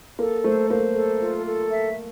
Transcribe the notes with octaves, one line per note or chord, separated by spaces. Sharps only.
A#3 A4
A3 C5
A#3 C5
A4
F4
A4
E5